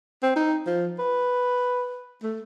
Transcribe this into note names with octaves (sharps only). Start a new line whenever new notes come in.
C4
D#4
F3
B4
A3